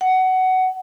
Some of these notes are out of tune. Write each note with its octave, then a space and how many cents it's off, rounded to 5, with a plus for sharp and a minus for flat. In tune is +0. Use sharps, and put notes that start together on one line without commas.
F#5 +15